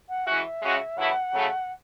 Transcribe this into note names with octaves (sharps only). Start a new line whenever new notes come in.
F#5
E3 G#3 C#4 F#4 E5
C#3 G#3 C#4 F#4
F#2 C#3 E3 A3 E4 F#5
C#3 F#3 A3